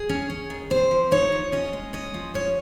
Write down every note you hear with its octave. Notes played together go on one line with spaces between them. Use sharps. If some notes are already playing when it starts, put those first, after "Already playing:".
Already playing: G#4
C#4
C#4
D#3
C4 C5
F3
D#4 C#5
F3
C#4 D#5
G#3
C#4 D#5
F3
C#4 C#5